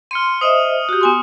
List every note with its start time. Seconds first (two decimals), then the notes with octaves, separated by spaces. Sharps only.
0.11 C6 F6 C#7 D#7
0.41 C5 D#5 E5 D#6 F#7
0.89 F#4 G4
1.01 B3 G#5 C6